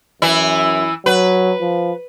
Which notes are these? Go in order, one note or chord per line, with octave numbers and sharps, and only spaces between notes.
F#2 E3 E4
F#3 B4
F3